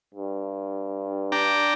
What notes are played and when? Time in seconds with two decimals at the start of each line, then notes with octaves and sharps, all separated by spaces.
0.15 G2
1.32 D4 G5 A#5